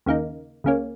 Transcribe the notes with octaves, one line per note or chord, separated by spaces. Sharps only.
D#2 C#3 A#3 D#4
C#2 C#3 A#3 C#4